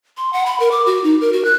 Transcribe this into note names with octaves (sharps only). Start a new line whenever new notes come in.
C6
F#5
B5
A#4
D6
F#4
D#4
A#4
F#4
F#6